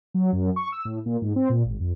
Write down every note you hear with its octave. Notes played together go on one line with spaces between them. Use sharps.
F#3
F#2
C#6
E6
A2
A#2
G#2
C4
A#2
G#1
F2